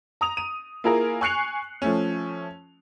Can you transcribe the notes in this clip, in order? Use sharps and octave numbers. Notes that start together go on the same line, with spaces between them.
A#5 D#6 F7
D#7
A#3 E4 F4 G#4 A#4
G#5 C#6 F#6 C7 C#7 F7
F3 A3 C#4